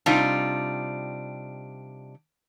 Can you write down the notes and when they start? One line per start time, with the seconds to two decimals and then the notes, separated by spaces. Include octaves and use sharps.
0.06 C3 G3 D4 D#4 F4